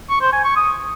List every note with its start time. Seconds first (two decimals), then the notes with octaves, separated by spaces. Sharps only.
0.10 C#6
0.21 C5
0.33 G#5
0.45 C#6
0.56 D#6